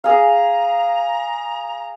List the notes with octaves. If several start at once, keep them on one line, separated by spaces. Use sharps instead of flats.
G#4 F5 A#5